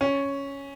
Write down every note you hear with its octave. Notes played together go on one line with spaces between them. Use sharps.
C#4